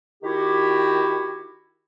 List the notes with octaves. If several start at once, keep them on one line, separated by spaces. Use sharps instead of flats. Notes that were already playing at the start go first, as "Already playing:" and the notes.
D#3 E4 F#4 G4